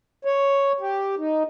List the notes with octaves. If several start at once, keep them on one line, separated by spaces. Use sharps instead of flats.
C#5
G4
D#4